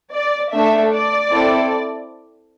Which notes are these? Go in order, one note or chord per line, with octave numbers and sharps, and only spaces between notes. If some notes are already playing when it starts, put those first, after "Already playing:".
D5
A3 D4 A4 E5
D5
C4 E4 A4